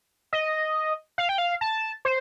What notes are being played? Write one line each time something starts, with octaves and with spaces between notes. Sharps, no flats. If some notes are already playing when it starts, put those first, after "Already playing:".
D#5
F5
G5
F5
A5
C5